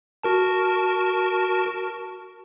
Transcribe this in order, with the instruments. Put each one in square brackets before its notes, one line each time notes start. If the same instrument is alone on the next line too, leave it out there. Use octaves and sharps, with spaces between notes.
[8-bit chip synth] F#4 A#4 A5